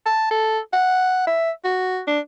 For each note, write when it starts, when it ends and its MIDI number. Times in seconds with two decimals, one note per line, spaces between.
0.06 0.30 81
0.31 0.59 69
0.73 1.25 78
1.27 1.50 76
1.64 2.02 66
2.07 2.20 62